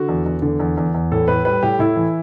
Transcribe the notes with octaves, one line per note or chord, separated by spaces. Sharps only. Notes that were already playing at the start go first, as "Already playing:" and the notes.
Already playing: D3 F#4
E2
E2
D3
E2
E2
E2
A2 A4
A2 B4
G3 B4
A2 G4
A2 E4
E3